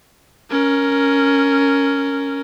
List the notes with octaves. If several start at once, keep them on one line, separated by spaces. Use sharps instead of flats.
C#4 A#4